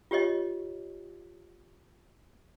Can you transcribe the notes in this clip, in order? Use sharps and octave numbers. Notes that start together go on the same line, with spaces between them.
F4 G4 C#5 D#5